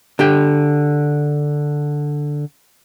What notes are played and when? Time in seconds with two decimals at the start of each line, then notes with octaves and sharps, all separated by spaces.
0.19 D3 G4 G5